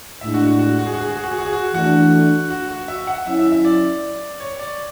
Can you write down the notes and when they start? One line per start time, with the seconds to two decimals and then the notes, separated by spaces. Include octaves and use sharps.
0.21 A2 G#3 D4 E5
0.34 F#4
0.47 F#4
0.59 F#4
0.79 F#4
0.86 G#4
0.94 F#4
1.00 G#4
1.08 F#4
1.16 G#4
1.24 F#4
1.30 G#4
1.38 F#4
1.45 G#4
1.53 F#4
1.74 E3 A3 D4 F#4
2.50 F#4
2.69 F#4
2.88 E5
3.07 F#5
3.26 F#3 C#4 E4 E5
3.39 E5
3.52 E5
3.65 D5
4.40 C#5
4.59 D5